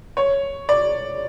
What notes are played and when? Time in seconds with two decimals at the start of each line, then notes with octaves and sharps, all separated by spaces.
0.17 C#5
0.69 D5